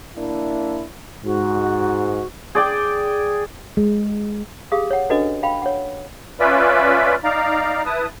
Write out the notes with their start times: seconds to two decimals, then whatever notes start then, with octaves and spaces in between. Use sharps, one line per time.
0.17 A#3 D4 E4
1.25 G#2 F#4
2.55 G#4 D5 G5
3.77 G#3
4.72 G4 G#4 F5 D#6
4.91 C#5 F#5
5.10 C#4 D4 F#4 A4 B4 D#5
5.43 F5 G5 B5
5.62 C#5 F#5
6.40 C#4 F4 B4 D5 E5 B5
7.24 D#4 D5 F5 A#5
7.85 E4 B4 A5 D#6